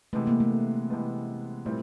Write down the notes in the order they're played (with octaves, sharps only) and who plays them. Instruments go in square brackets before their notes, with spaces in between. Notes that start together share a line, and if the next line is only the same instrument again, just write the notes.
[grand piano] C3 E3 G#3 B3 [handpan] A3
[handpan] A#3
A3
[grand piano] C3 E3 G#3 B3
[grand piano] A#2 G3 C4 E4 [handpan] A3